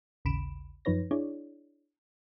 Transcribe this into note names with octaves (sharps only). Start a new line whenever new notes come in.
A1 D#2 C#3 B5 D7 E7
F#2 F3 D#4 B4 C#5 A#6
D4 E4 G#4 C#5 D5